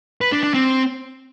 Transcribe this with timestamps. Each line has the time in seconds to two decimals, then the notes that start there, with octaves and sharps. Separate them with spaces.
0.21 B4
0.32 D4
0.43 D4
0.54 C4